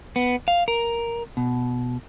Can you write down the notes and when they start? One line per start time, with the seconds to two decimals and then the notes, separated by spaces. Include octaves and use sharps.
0.16 B3
0.48 F5
0.68 A#4
1.37 B2